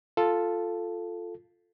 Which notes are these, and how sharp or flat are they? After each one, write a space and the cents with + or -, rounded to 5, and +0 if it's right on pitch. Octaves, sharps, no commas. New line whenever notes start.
F4 +0 A4 +0